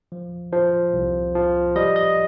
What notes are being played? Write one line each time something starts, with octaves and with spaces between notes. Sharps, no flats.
F3
F3 C5
C2
F3
G3 D#5
D#5